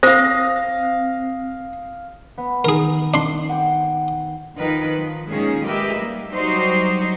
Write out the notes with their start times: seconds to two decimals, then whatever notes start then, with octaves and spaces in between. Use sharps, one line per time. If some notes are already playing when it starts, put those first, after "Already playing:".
0.03 C4 C5 F5 D#6 A#6
2.38 B3
2.65 D#3 D#4 G#4 A#4
3.14 D4 C6
3.49 F#5 G5
4.56 F2 D#3 F3 B4
4.96 F3
5.28 A#2 D#3 G#3 C#4 G#4
5.65 G#3 G4 A#4 B4 D#5 E5
5.97 G3 A#3
6.29 F#3 G3 D#4 F#4 G4 C5